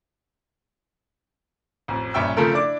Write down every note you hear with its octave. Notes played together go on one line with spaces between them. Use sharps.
A1 F2
A#1 G2 C#4 E5 G5 E6
C#3 F3 A3 C4 A4 A#4
D4 E4 D5 D6